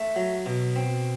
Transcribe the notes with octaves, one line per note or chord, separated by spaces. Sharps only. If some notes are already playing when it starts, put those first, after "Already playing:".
Already playing: A3
F#3
B2
C4